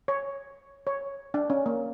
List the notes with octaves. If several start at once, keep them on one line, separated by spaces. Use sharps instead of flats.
C#5
C#5
D4
C#4
A#3